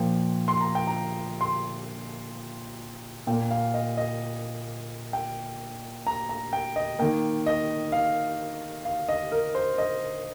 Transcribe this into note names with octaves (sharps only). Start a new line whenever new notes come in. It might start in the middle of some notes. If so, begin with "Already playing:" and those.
Already playing: A#2 F3 A#3 G5
C6
A#5
G5
A#5
C6
A#2 A#3 G5
F5
D#5
D#5
G5
A#5
A#5
G5
D#5
D#3 A#3 G5
D#5
F5
F5
D#5
A#4
C5
D#5